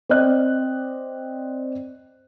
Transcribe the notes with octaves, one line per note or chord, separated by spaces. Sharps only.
C4 D5 D#5 F#6